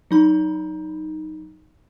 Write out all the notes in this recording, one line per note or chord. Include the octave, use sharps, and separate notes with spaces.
F#3 D#4 B5